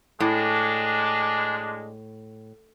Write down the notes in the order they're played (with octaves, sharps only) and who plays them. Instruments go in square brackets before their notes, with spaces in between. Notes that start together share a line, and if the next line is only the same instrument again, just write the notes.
[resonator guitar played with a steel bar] A2 [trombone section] G#3 D4